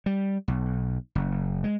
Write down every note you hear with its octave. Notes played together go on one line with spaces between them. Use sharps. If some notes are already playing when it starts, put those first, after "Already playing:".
G3
B1
F#1
G#3